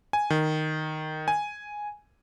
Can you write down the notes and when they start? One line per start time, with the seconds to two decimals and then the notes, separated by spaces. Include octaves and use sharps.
0.13 G#5
0.30 D#3
1.28 G#5